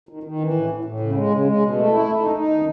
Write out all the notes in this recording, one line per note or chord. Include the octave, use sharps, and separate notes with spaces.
D#3
D#3
E3
A2
A2
A2
C#3
G#3
C#3
G#3
B2
A3
E4
A3
D#4
D#4
D#3